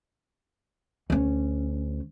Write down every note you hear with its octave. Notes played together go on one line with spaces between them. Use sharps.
D2 C#4